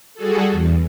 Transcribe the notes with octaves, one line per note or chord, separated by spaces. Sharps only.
G3 F#4 G#4 A4
E2